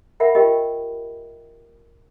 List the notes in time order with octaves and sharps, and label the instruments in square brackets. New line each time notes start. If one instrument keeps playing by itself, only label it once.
[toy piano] A#4 E5 F#5 B5
F4 G4 A#4 D#5 G5 B5